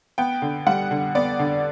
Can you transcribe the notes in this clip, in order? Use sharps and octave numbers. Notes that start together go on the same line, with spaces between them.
B3 G5
D3
G3 F#5
D3
B3 D5
D3